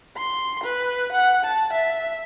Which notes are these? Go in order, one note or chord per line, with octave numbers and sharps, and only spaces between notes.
C6
B4
F#5
A5
E5